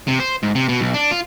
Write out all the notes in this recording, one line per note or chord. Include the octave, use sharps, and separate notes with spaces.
C3
C5
G#2
C3
B2
B1
D4
F4